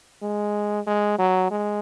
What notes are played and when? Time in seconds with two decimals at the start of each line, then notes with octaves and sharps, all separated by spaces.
0.22 G#3
0.87 G#3
1.18 F#3
1.51 G#3